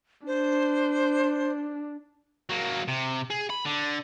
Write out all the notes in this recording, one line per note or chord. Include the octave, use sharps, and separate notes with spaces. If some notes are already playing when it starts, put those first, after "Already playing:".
D4 C5
F#3 A#3
C3
G#4
B5
D3